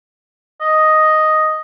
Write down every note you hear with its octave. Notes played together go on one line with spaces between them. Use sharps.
D#5